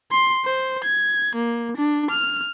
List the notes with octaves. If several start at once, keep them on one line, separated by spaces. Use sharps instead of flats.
C6
C5
G#6
A#3
D4
F6